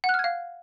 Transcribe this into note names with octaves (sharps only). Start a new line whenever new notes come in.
F#5
F#6
F6
G#6
F5